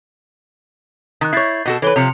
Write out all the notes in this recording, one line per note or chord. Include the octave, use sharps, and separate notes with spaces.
D#3 D#6 F#6
E4 C#5 G6 A6 C7
B2 F#4 A4
E3 A4 B4 C#5 G7
C3 F3 C#7 F7